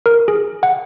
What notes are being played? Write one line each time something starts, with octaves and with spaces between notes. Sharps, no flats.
A#4
G#4
F#5